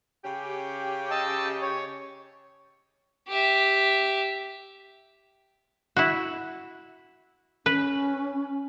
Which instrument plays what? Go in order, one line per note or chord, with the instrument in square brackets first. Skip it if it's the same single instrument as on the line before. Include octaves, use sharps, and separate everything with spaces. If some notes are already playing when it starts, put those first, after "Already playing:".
[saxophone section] C#3 C#4 G4
[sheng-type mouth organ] D#5 A5 E6
C#5
[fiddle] G4 E5
[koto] E4 F#4
[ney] C#4 [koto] B4